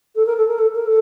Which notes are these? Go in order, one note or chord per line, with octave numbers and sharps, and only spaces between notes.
A4
A#4
A4
A#4
A4
A#4
A4